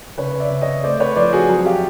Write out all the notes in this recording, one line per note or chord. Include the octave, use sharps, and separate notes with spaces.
C#3 B4 C#5
D5 E5
C#3
C#5 D#5
A3 C5 D5
B4 C#5
F3 C5 D5
F#4 G#4
F#3
F4 G4